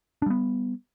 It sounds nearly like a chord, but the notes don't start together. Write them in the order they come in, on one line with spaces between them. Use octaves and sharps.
D4 G3 B3